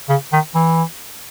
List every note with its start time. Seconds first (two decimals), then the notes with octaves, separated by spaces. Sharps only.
0.09 C#3
0.32 D#3
0.55 E3